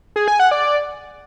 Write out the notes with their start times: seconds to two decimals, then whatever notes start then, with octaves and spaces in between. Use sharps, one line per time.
0.16 G#4
0.28 G#5
0.40 F#5
0.51 D5